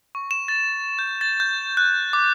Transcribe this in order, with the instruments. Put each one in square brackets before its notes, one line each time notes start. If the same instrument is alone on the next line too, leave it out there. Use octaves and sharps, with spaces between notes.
[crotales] C#6
E7
A6
G6
A6
G6
F#6
D6